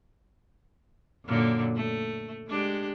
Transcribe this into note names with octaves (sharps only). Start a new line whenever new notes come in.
F#2 A#2 D3
A3
G#3 D4 G4